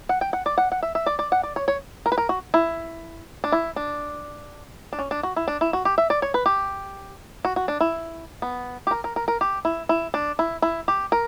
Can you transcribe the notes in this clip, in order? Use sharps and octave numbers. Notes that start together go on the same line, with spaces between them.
F#5
G5
F#5
D5
F#5
F#5
E5
E5
D5
D5
F#5
D5
C#5
C#5
A#4
B4
A#4
F#4
E4
D4
E4
D4
D4
C#4
D4
F#4
E4
D4
E4
F#4
G4
E5
D5
C#5
B4
G4
F#4
F#4
D4
E4
B3
G4
A#4
A#4
A#4
A#4
G4
E4
E4
D4
E4
E4
G4
A#4